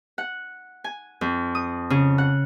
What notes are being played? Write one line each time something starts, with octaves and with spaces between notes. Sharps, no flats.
F#5
G#5
F2
D#6
C#3
F#5